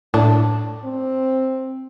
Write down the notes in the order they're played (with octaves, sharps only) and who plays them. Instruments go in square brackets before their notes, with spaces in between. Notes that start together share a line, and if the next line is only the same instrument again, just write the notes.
[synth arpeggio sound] A2 [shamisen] D4
[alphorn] C4